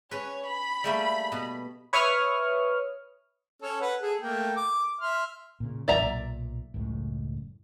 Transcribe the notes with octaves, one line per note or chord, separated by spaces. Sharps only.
C#4 B4 C#5
B5
G3 A3 A#3
B2
B4 C#5 E5 C#6 D#6 F6
C#4 A4
B4 F#5
G#4 A4
A3 A#3 G5
D6
E5 C6 F6
A#2 C#3
A1 D#2 F#3 D5 E5 A#5
B1 A#2
F#1 C#2 A2